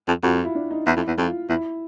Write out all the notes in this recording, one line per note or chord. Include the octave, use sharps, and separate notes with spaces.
F2
F2 F#4
F4
E4
D4
D#4
E2 E4
F2
E2
F2 F4
E2 E4